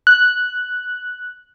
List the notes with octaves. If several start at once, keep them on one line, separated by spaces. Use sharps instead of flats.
F#6